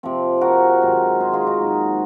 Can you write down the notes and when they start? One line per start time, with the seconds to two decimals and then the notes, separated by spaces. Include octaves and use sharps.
0.03 C3 F3 C4
0.41 F#4 A#4
0.82 G#2 D#3 F#3 C4
1.20 G#4 C5
1.33 F4 G#4
1.47 D#4 F#4
1.60 G#2 F#3 A#3